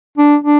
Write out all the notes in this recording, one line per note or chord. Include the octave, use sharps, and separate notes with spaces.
D4
D4